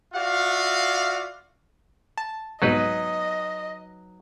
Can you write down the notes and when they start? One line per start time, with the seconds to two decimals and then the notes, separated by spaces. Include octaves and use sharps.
0.13 F4 F#4 D5 E5 F5
2.17 A5
2.62 C2 G#2 B2 F#3 D#4 B4 D#5